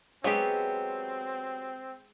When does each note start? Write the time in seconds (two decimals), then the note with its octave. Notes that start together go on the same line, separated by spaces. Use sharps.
0.24 F#3 G#3 B3 C4 G4